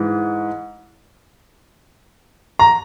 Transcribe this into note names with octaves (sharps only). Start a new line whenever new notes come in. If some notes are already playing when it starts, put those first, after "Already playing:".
Already playing: G#2 E3
A#5